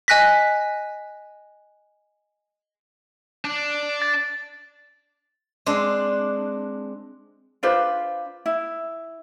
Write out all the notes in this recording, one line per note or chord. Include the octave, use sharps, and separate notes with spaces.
D#5 G#5 F#6 A#6 B6
D4
A6
G#3 C4 D4
D4 F4 B4 C5
E4